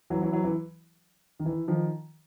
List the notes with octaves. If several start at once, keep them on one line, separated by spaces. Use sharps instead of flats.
E3 F#3
E3 F#3
E3 F#3
E3
D#3
E3
D#3 F3